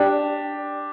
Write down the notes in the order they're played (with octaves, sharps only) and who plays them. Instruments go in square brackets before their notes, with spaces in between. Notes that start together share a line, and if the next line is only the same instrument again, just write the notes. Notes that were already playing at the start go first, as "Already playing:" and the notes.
Already playing: [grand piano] D4 G4